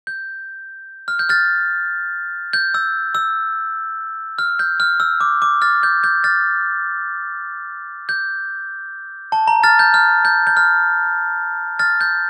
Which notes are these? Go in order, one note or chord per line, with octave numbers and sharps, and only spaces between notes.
G6
F6
G6
F6 A6
G6
E6
E6
F6
G6
F6
E6
D6
D6
F6 A6
G6
G6
F6 A6
G6
A5
A#5
F6 A6
G6
F6
G6
G6
F6
F6 A6
G6